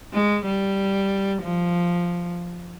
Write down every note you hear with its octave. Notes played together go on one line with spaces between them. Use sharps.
G#3
G3
F3